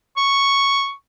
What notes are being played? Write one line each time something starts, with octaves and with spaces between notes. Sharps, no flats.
C#6